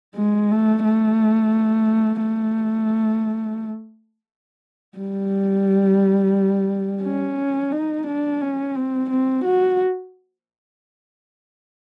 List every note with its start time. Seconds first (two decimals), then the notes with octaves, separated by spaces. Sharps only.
0.16 G#3
0.51 A3
0.85 A3
2.23 A3
4.98 G3
7.03 C#4
7.72 D#4
8.07 D4
8.41 C#4
8.75 C4
9.10 C4
9.44 F#4